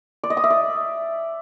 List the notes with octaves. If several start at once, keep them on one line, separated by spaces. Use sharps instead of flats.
D5
D#5
D#6
E5
D5